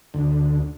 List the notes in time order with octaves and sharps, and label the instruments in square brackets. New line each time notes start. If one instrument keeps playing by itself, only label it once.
[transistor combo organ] D2